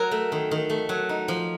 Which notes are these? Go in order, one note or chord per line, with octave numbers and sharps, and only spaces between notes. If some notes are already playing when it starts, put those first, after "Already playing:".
Already playing: F#3 A#4
A3
D#3
D#3
A3
F#3
D#4
F3